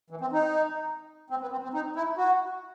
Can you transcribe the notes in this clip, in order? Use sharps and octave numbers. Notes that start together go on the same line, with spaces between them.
E3
C4
D#4
C4
B3
C4
C4
D#4
E4
F#4